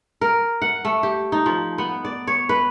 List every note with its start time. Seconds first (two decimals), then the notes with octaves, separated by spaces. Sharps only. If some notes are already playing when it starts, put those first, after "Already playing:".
0.21 A#4
0.62 F#5
0.85 A3
1.03 G4
1.32 D#4
1.46 F3
1.78 B3
2.05 D5
2.27 C#5
2.49 B4